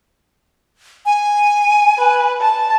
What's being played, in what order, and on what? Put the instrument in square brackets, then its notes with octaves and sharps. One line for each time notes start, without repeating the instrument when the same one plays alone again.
[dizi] G#5
[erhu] B4
A5